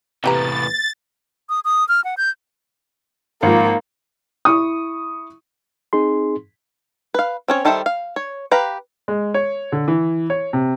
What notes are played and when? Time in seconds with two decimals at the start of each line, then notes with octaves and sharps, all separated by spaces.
0.24 E2 A2 C3 A#3 G4 B4 A#5 A6
1.49 D#6
1.65 D#6
1.89 F6
2.04 F#5
2.17 G6
3.43 G#1 F3 A#3
4.45 E4 C#6 D#6
5.93 C4 D#4 G#4 C6
7.14 B4 F5
7.48 C4 C#4 C#5
7.65 D#3 G3 A4 C5 E5
7.86 F5
8.16 C#5
8.52 G4 B4 F5 A#5
9.08 G#3
9.34 C#5
9.72 D3
9.88 E3
10.30 C#5
10.53 C3